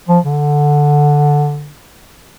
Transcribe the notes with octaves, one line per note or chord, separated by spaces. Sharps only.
F3
D3